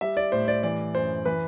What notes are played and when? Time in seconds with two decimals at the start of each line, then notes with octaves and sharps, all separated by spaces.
0.01 G3 E5
0.17 D5
0.32 A2 C5
0.48 D5
0.63 E3 D5
0.94 F#2 C5
1.25 E3 B4